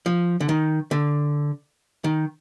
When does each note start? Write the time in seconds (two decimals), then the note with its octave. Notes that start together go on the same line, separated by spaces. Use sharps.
0.06 F3
0.40 D3
0.49 D#3
0.91 D3
2.04 D#3